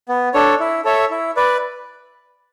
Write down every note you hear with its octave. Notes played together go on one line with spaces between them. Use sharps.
B3
D4 A4 C#5
E4
A4 C#5 E5
E4
B4 D5